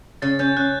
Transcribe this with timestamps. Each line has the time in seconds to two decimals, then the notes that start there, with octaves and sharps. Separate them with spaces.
0.22 C#3 A6
0.39 C#4 G6
0.56 C#3 F#6